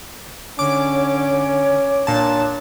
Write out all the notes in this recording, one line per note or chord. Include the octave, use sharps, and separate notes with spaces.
D3 C#4 C#5 D6
A#2 D4 A5